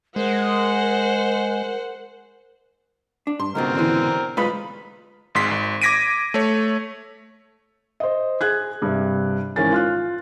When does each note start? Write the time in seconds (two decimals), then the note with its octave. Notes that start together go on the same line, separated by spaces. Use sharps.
0.16 G#3 A#4 C5 F#5
3.27 D4
3.40 G2 C6
3.55 C#2 G#2 B2 C4 A#4
3.75 D3 E3
4.37 B1 G#3 F4 B4 B5
5.35 G#1 G#2 C6 B6
5.51 G#1
5.82 D6 G#6 A#6 B6 D7 D#7
6.34 A3 C#5
8.00 C5 D#5
8.41 G#4 F#6 G#6
8.82 G2 C3
9.56 G#1 E3 C#4 A#4 G#5 A6
9.73 F4 F6 F#6